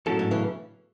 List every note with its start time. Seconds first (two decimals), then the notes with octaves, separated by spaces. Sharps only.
0.06 F#2 A2 F#3 C#4 E4 A4
0.19 G#2
0.31 C#3 E3